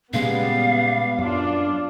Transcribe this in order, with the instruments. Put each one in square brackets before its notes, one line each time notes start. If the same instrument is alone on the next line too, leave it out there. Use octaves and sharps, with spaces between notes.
[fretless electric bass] A#2 C#3 G#3 [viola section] G3 B3 [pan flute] F5
[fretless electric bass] F#2 [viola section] D4 F4 D5